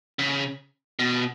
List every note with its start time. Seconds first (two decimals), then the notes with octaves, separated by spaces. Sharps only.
0.19 C#3
0.99 B2